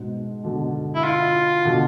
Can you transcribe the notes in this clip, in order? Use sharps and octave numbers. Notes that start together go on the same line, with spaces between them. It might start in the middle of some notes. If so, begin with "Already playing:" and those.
Already playing: G#2 B2
B2 D3
E4
F4
B2 D3